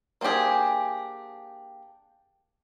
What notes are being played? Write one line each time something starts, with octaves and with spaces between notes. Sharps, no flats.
A#3 C4 D4 G4 G#4